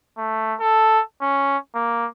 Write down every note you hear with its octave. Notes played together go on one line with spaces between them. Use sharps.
A3
A4
C#4
A#3